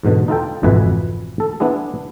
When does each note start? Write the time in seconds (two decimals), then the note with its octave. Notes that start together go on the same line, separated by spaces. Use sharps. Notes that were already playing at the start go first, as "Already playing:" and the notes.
0.03 E2 G#2 B2 D3
0.28 D#4 F4 A4 G5
0.63 G#1 F2 B2 E3 B4 G#5
1.40 A4
1.60 B3 D4 E4 G#4